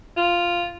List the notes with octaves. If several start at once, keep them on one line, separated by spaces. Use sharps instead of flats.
F4